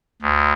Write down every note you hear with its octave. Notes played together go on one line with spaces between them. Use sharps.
D2